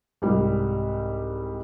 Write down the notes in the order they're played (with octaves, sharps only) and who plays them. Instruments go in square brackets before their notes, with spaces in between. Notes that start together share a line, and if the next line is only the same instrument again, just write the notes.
[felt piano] C2 G#2 G3